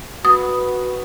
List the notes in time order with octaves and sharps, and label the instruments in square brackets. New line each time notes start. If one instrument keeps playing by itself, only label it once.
[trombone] F#4 [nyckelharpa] B4 [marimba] D#6